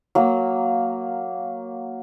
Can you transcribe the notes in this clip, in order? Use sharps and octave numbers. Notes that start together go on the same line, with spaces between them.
F#3 A#3